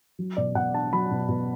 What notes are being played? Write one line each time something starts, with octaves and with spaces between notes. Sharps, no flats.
F#3
B2 D5
B2 F#5
D4 A5
F#3 B5
B2
B2